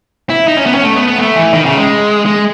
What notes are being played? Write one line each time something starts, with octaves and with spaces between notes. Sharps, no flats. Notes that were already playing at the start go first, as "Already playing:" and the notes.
E4
D#4
C#4
B3
C#4
A3
B3
B3
A3
E3
D#3
C#3
G#3
G#3